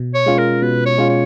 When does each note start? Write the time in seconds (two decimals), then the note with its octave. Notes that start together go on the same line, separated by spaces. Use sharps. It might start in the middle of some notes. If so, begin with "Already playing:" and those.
Already playing: B2
0.14 C#5
0.26 G#3 C#4 F4
0.38 A#4
0.62 B2 B4
0.86 C#5
0.98 G#3 C#4 F4
1.10 C#5